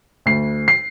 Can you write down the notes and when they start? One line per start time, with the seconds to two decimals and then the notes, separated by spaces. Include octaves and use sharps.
0.26 D2 C7
0.68 C7